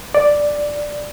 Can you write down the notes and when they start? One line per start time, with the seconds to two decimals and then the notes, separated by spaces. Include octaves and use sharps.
0.15 D5